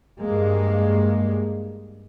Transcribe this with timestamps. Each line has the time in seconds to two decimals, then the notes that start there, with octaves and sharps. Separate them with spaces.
0.21 G2 G#3 A#3